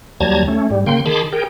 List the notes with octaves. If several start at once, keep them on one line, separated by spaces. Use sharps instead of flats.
D#2 F#3 G3 A5 A#5 G#6
A3 C#4
G#2 G3
C#3 A#3 G5 C6
D#3 G#4 A5 B5 C6 D6
G#4 A#4 G5